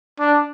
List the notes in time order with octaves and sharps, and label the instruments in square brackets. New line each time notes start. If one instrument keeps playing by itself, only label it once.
[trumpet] D4